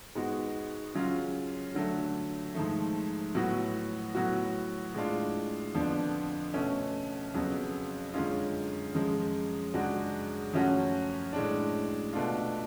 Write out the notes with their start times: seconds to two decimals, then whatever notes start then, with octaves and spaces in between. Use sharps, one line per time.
0.15 G#2 G#3 B3 F#4
0.94 C#3 F#3 C#4 F4
1.74 D3 F#3 A3
2.54 G#2 F3 A3
3.35 A2 F#3 B3 F#4
4.15 A2 F#3 B3 F#4
4.94 A2 G#3 D4 F4
5.74 F2 D3 F3 B3 D4
6.54 B2 A3 C#4
7.34 F2 C#3 F#3 B3
8.14 F#2 D3 G#3 C#4 F4
8.94 F#2 F3 G#3
9.74 F#2 C#3 G#3 D4 F#4
10.53 F#2 F3 A3 C#4 F#4
11.33 A2 G#3 D4
12.13 B2 A3 D4 F4